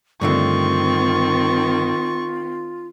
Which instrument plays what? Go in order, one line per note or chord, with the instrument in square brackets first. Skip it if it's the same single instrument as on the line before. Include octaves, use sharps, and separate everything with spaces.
[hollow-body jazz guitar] G2 D3 A3 [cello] D#3 C4 [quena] F4 [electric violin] C#6